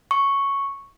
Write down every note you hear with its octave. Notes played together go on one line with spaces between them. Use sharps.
C#6